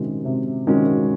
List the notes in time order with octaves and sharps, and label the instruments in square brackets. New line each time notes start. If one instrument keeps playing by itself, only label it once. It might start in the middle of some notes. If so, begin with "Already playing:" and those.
Already playing: [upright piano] C3 D#3 G#3 C#4 F#4
C3
D#3 G#3 C#4 F#4